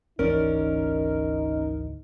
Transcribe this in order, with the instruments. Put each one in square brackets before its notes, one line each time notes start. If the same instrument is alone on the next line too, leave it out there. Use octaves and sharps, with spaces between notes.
[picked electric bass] G#1 D2 E3 [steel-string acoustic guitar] C#4 D5 [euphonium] D#4 [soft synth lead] A#4